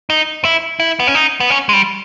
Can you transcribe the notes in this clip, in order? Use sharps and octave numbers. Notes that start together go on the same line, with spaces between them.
D#4
E4
E4
B3
C#4
D#4
B3
C#4
G#3
G3